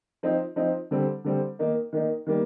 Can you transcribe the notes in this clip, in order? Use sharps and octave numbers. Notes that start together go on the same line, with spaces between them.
F3 C4 D#4
F3 C4 D#4
D3 G3 C4
D3 G3 C4
D#3 A#3 D#4
D#3 A#3 D#4
D#3 G3 A#3